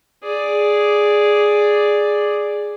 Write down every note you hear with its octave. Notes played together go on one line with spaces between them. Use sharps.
G#4 D5